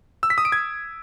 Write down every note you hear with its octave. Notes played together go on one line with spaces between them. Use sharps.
E6
B6
D#6
D7
G#6